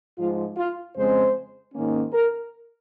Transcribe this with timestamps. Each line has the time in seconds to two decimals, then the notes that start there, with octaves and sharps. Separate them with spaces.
0.19 G#2 F3 G#3 F4
0.57 F4
0.96 F2 C#3 G#3 C4 C5
1.74 G#2 D#3 A#3 C#4
2.14 A#4